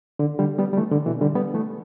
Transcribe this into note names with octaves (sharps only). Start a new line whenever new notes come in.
D3
D3 G3
G3 B3
G3
E3 A3
D3
B2 E3
D3 G3
G3 B3
E3 A3